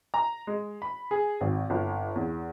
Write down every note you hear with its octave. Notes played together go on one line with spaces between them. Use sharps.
A#5
G#3
B5
G#4
G#1
G1
E2